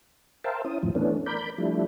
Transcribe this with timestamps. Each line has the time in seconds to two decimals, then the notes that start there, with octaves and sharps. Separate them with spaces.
0.44 A#4 C5 E5 F5 G5 A5
0.65 C#4 E4 D#6
0.83 F2 A2 E3 F3
0.95 E3 A3 B3 C#4 D4
1.26 A#4 D5 B5 G6
1.58 F3 G3 A3 D4 E4